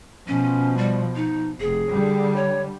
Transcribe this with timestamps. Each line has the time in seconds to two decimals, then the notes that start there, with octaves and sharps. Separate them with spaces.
0.27 B2 F3 C#4
0.77 G3
1.16 D#4
1.60 F1 G#4
1.90 D3 G3
2.36 C#5